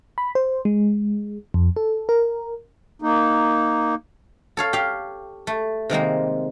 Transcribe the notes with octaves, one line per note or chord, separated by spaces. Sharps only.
B5
C5
G#3
F2
A4
A#4
A#3 D#4
A4 C#5 F5
G4 F5
A3
C3 D#3 G#3 A#3